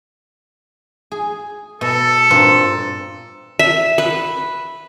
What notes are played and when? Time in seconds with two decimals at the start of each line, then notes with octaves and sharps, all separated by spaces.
1.12 G#4
1.81 B2 A4
2.30 G2 A#2 C4
3.59 E5
3.98 B4